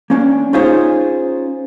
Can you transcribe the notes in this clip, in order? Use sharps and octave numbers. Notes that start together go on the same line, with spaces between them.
A#3 C#4 D4
C#4 D#4 F4 G#4 C5 C#5